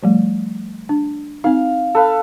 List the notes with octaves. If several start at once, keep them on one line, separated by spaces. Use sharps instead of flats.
F3 G3 A3
D4
C4 D#4 F5
A4 B4 F5